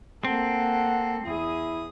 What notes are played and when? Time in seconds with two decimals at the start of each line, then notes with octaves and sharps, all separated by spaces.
0.25 A#3 C4 A4 F#5
1.26 E2 E4 G#4 D#6